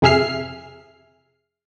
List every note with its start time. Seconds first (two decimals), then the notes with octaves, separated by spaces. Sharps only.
0.02 F2 C3 G#4 E5 F6 C7